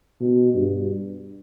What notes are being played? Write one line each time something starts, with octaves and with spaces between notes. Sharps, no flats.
B2
G2